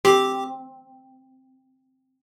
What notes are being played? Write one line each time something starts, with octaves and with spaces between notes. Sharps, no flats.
C4 G4 D6